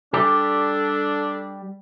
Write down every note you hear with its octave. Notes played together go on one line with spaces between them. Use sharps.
G3 D4 G4 A4